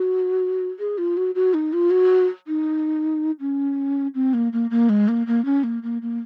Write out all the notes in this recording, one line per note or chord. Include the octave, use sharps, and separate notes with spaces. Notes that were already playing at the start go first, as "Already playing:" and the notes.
Already playing: F#4
G#4
F4
F#4
F#4
D#4
F4
F#4
D#4
C#4
C4
A#3
A#3
A#3
G#3
A#3
A#3
C#4
A#3
A#3
A#3